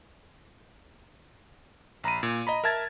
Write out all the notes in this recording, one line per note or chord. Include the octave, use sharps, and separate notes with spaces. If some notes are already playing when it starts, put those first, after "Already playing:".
A#1 A#5 B5 D#7
A#2
D#5 A#5 B5
A#4 E5 A5 G#6 A6